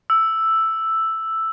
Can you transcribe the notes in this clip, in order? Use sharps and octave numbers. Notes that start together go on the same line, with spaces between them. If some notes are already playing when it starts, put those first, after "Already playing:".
E6